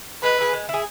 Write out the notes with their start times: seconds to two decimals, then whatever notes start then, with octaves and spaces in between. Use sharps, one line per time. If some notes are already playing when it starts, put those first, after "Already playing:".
0.23 G#3 B4
0.38 E4 G#4
0.53 G#3
0.69 E4 G#4